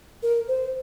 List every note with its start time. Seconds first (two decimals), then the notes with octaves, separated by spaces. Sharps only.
0.23 A#4
0.48 C5